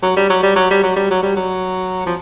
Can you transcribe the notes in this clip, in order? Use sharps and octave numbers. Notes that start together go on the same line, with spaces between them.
F#3
G3
F#3
G3
F#3
G3
F#3
G3
F#3
G3
F#3
F3